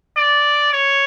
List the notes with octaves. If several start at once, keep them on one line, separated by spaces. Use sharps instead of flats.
D5
C#5